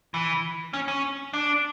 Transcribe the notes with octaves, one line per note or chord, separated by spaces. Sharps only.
E3
C#4
C#4
D4